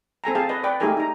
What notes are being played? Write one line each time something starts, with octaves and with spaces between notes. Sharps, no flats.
C4 A4 G#5 A#5
G#4 F5 A5
B4 D#5
B4 D5 G5
A3 D#4 G4 G#4 A#4 G#5
D#4 A#5